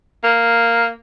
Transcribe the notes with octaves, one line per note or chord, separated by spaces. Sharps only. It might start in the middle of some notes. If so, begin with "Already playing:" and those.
A#3